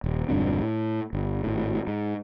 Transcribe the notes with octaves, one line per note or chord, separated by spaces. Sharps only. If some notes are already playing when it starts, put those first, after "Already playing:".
D#1
E1 G2 D3 C4
A2
G1
G#1 A2
G#2